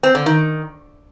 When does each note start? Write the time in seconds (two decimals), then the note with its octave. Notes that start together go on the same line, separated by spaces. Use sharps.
0.03 C4
0.15 D3
0.26 D#3